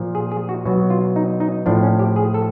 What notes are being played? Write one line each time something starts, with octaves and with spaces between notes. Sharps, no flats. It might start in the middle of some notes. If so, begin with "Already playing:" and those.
Already playing: A#2 F3
G#4
G#4
F#4
B2 F#3 F#4
F4
D#4
D#4
A2 F3 D4
C#4
G4
G#4
A4